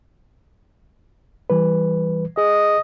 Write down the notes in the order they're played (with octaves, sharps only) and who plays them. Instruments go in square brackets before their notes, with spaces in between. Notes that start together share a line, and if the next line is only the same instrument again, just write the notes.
[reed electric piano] E3 G3 B4
[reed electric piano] G#4 [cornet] D#5